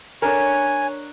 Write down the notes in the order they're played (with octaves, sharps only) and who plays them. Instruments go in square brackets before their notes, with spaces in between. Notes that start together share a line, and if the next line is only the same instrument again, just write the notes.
[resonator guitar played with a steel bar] D4 A#4 [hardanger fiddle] C#5 [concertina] G#5